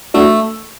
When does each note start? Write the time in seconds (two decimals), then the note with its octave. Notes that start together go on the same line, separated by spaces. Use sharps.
0.14 A3 D4 F#4